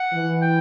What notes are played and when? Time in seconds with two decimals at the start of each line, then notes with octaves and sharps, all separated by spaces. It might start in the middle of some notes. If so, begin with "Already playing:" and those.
Already playing: F#5
0.13 E3
0.42 G5